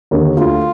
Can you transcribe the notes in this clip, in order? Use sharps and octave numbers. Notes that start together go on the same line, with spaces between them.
D#2 D3
D2 F4